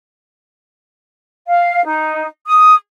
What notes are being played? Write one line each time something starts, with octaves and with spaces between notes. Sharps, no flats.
F5
D#4
D#6